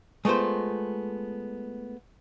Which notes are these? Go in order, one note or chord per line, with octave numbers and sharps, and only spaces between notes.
G#3 A3 B3 F4 C5